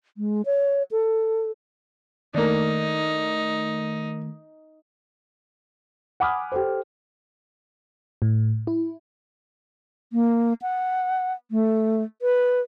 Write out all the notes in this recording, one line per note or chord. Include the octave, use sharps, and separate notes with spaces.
G#3
C#5
A4
D#3 A3 A#3 D4 D#4
F#5 G#5 B5 D6 D#6 F6
G4 A4 C5
A2
E4
A#3
F#5
A3
B4